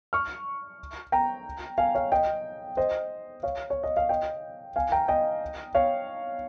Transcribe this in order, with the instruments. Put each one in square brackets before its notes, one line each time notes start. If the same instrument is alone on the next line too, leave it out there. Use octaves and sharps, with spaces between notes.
[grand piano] C#6 F6
G5 A#5
F5 G#5
C#5 F5
D#5 G5
C5 D#5
C#5 F5
C#5
D#5
F5
D#5 G5
F5 G#5
G5 A#5
D#5 G5
C#5 F5